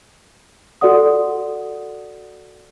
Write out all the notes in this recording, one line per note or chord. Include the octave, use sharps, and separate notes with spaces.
F#4 A4 D5 F#5 D#6